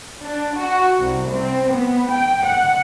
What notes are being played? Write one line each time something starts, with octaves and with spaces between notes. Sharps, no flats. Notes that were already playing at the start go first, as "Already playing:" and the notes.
D4
F#4
C2
C4
B3
G5
F#5